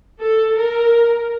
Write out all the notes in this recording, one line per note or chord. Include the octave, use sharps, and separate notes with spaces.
A4
A#4